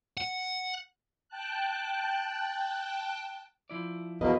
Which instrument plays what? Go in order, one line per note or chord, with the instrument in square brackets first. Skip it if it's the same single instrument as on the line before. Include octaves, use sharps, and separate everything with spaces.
[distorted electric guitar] F#5
[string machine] G5 A5 F#6
[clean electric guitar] F3 E4 D5
[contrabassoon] E2 [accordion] B2 A#3 [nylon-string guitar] B4 D#5